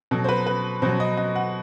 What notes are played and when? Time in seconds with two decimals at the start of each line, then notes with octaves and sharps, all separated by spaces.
0.11 B2 F#3 A4
0.24 C5
0.29 B4
0.47 B4
0.82 B2 F#3 C5
1.00 D#5
1.17 D#5
1.36 F#5